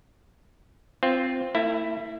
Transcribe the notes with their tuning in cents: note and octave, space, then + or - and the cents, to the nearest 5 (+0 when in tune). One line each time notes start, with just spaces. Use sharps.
C4 +0 F4 +0
A3 +45 E4 +0